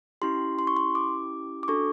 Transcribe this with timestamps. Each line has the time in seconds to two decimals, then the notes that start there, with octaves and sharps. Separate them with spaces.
0.22 C#4 E4 G4 C6
0.59 C6
0.67 C#6
0.77 C6
0.95 D6
1.63 D6
1.68 D4 F#4 A4 C#6